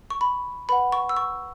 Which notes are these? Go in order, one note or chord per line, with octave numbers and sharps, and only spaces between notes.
C#6
B5
B4 F#5 B5
C#6
E6
C#6